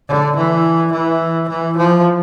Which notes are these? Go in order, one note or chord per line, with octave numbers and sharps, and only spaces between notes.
D3
E3
E3
E3
F3